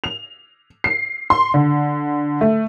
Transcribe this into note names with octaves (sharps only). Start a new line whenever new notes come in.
F7
C7
C6
D3
A3